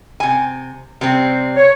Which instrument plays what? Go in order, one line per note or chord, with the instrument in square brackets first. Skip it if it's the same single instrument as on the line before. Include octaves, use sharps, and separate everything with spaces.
[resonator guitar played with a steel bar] C3 G#5
C3 G3 C4
[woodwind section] C#5